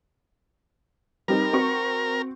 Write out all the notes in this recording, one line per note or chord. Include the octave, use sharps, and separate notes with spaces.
G3 C4 D#4 A#4
C4 F#4 C#6